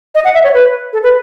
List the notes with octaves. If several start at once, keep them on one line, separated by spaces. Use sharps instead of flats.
D#5
F#5
E5
C#5
B4
A4
B4